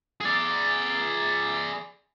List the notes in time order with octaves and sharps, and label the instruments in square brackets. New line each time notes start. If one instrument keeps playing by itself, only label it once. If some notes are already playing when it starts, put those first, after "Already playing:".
[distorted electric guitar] G#4 D5